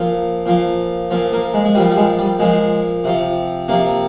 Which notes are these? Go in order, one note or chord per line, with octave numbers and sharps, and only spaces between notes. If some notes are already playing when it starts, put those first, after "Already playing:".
Already playing: A#2 F3
A#2 F3
A#2 F3
A#3
G#3
G#3
A#2 F3 G3
G3
G#3
G3
A#2 F3 G#3
C3 F3
C3 F3 A#3